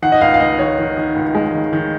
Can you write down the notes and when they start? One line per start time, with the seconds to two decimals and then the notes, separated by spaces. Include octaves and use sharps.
0.02 D#3 F#5
0.12 D#5
0.21 C#2 F5
0.34 F5
0.40 C#2 D#5
0.59 D#3 C#5
0.78 D#3
0.97 D#3
1.16 C#2
1.35 G#3
1.54 D#3
1.73 D#3